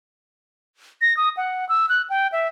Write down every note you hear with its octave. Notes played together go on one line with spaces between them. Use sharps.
A#6
D#6
F#5
E6
F#6
G5
E5